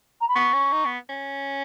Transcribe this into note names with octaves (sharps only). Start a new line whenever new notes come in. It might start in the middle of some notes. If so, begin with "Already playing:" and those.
A#5
B5
B3 C#6
C#4
D#4
B3
C#4